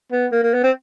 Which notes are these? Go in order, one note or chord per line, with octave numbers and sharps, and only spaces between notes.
B3
A#3
A#3
B3
C4